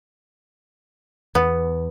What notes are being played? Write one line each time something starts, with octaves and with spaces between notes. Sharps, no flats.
E2 B3